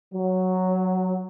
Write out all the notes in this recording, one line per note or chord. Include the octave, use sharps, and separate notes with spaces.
F#3